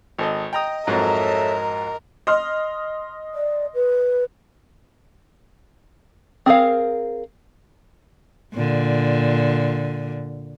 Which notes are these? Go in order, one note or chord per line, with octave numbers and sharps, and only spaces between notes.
G#1 A4 D#5
D#5 G5 A#5 D#6
F2 G#2 F#3 A4 A#4 C#5 E5
D#5 C6 F6
D5
B4
C4 G#4 A#4 F5
A#2 D3